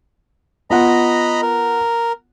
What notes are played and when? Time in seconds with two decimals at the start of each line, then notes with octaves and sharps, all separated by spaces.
0.70 B3 F4 D#5 F#5 A#5 B5
1.42 A#4